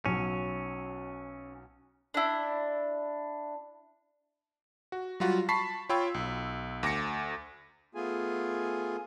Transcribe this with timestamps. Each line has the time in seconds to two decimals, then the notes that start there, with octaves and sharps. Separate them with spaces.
0.06 B1 F#3 C#4
2.14 D4 E4
4.92 F#4
5.20 F#3 G3 F4 F#4
5.49 A5 B5 C#6 B6 C7
5.89 F4 C#5 G5 B5 C#6 E6
6.14 B1
6.83 D2 D6 A#6 C#7
7.95 A3 B3 F4 G#4 G#5